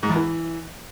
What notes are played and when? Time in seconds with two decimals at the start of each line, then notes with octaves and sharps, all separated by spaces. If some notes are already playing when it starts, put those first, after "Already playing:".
0.03 G#2
0.09 E2
0.16 E3